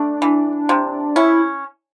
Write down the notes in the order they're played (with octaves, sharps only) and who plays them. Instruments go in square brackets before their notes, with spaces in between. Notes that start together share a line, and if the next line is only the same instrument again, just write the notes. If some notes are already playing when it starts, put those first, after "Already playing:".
Already playing: [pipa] A3 [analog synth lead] D4
[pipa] E3
C3
[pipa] C#4 [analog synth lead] E4